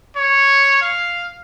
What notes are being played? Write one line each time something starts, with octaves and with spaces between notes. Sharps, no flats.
C#5
F5